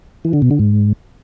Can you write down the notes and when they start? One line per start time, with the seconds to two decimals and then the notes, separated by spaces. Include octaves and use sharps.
0.25 E3
0.33 D3
0.42 B2
0.51 D3
0.59 G#2